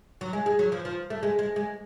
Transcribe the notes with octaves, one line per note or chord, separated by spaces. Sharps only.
F#3
G#3
G#3
F#3
F3
F3
A3
G#3
G#3
G#3